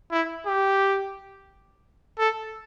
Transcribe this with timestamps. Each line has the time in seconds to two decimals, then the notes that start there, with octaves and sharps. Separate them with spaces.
0.11 E4
0.46 G4
2.18 A4